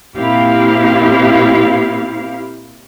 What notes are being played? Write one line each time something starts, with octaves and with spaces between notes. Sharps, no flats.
A#2 A#3 C4 E4 G4 F5